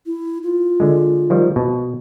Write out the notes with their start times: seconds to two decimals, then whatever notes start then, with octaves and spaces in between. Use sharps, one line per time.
0.06 E4
0.43 F4
0.80 D3 G#3
1.30 D#3 F3 G3
1.56 B2